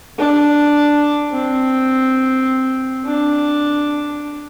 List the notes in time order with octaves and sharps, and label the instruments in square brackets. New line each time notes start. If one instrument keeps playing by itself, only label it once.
[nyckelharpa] D4
C4
D4